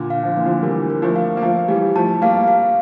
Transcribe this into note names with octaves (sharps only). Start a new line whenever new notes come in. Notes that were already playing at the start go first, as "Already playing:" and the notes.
Already playing: A#2 D3
F5
F3
E3 A#3
D3 F3
E3 G3 A#4
A#4
F3 A3
F5
A#3
F3 A3 F5
E3 G3 G4
F3 A3 A5
G3 A#3 F5
F5